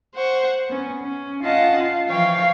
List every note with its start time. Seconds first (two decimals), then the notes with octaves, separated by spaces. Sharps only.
0.14 C5 F#5 C#6
0.69 B3 C#4
1.02 C#4
1.43 C#4 F4 D#5 F5 F#5 A5
1.80 F4 F5
2.09 E3 F3 C#5 F5 G5